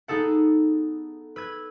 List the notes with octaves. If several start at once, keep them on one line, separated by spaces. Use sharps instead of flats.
B3 D#4 G#4 A4 F#5
B4 E6 G#6